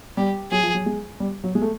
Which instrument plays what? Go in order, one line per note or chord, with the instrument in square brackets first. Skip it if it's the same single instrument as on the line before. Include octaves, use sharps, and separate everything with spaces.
[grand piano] G3 [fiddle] G4
[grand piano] F#3 [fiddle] G#4
[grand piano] F3
F#3
G#3
G3
F#3
G#3
A3